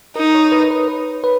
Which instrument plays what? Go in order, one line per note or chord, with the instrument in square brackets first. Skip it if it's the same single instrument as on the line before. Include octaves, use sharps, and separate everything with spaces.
[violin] D#4 [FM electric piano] A#4
[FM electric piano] C#5
B4
B4
B4
B4